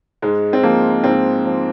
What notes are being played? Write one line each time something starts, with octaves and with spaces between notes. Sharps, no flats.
G#2 G#3
C4
F3 A#3
G#2 C4
F3